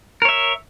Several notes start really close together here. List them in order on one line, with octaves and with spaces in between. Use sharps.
A#4 C#5 E5